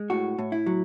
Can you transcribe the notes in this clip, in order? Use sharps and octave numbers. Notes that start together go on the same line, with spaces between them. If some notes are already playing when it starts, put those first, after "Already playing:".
Already playing: G#3
A2 F#4
A2
E4
F#3